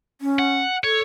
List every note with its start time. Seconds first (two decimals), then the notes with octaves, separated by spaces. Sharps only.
0.21 C#4
0.39 F#5
0.84 A4 C#5